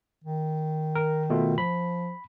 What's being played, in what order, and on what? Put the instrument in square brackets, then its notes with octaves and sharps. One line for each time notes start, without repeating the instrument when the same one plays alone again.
[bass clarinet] D#3
[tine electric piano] A#4
B2 A3 F4
[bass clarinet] F3 [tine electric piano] B5